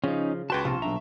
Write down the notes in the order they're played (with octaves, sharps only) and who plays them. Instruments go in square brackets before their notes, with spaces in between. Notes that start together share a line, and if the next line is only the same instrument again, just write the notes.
[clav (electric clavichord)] C#3 [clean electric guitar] F3 [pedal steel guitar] C#4 D#4
[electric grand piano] C#2 B4 E7 [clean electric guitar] F#4 G5 [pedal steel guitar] A5 C6 C#6
[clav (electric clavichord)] A#1 [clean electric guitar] C3 [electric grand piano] F4
[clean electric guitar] B1 D4 A#5 [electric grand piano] E5